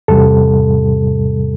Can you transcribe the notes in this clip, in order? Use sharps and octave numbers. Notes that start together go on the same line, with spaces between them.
E2 C3 G3 A4